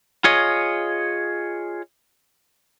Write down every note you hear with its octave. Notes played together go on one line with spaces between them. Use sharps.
F4 G#4 C#5 D#5